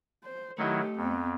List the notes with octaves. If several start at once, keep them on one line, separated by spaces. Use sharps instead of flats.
C5
D#3 F#3 A3 D#4 E4 G4 D#5
F2 B3 C4